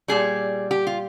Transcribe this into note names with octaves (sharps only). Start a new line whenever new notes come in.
A#2 G3 G#4
G4
F4